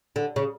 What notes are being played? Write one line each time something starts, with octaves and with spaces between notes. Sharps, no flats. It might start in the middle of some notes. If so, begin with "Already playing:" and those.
D3
C#3